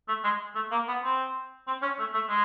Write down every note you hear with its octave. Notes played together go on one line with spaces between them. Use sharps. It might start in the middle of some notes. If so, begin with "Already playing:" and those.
A3
G#3
A3
A#3
B3
C4
C4
C#4
A3
A3
G#3